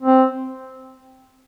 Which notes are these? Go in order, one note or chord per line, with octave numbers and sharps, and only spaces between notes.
C4